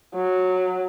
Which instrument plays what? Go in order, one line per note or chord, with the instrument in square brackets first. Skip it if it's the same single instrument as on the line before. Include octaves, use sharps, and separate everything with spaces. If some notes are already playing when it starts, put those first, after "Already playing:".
[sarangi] F#3